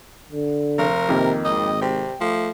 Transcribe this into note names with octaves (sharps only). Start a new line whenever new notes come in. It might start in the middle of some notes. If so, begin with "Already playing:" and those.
D3
F1 A#4
F2 C3 D#3 A#3
G#1 D#5
C3 G5
F3 A3